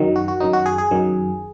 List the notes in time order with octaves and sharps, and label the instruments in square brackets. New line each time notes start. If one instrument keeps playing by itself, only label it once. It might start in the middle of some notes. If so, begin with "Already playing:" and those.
Already playing: [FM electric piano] F#2 D#3 F#3
F#4
F#4
F#2 D#3 F#3 D#4
F#4
G#4
G#4
F#2 D#3 F#3